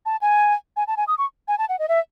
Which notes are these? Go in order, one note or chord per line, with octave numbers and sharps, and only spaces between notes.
A5
G#5
G#5
A5
G#5
D#6
C#6
G#5
A5
F#5
D#5
E5